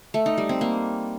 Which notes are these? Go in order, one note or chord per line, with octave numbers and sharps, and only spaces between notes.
A3
D#4
G3
C4
A#3